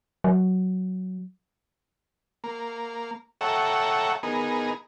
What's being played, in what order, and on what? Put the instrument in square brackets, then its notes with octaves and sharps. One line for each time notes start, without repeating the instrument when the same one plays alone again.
[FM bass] F#3
[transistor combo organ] A#3
A4 C#5 E5 F#5 G5 A#5
B3 D#4 G#4 A#4